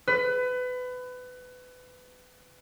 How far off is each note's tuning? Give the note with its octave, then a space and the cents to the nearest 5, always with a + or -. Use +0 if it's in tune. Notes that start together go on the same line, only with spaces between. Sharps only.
B4 +25